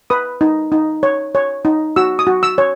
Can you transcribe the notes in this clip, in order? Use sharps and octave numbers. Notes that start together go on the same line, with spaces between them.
B4 D#6
D#4
D#4
C#5
C#5
D#4
F#4 E6
D#6
F#4
E6
C#5